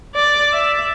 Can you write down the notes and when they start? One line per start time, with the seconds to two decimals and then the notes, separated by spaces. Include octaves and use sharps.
0.15 D5
0.53 E5